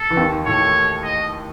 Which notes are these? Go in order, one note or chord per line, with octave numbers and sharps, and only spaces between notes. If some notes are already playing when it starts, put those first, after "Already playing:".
Already playing: A4
E3
D#2 D#3
A2 A3 C#5
D#5